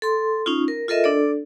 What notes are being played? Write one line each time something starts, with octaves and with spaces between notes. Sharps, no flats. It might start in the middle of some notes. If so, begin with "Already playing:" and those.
A4 C6
C#4 D#4 F4
A#4
F4 A4 A#4 D#5 E5
D4 A4 D5